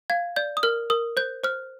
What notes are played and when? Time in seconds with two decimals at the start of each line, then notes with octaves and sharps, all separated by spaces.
0.10 F5 G#6
0.36 D5 G6
0.57 D#6
0.63 A#4 F6
0.90 A#4 D#6
1.17 C5 G6
1.44 C5 F6